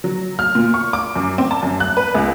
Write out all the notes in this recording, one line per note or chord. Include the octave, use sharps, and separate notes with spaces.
F#3
F6
A#2
C#6
D6
F#2
C4
A5
F#2
F#6
B4
C#2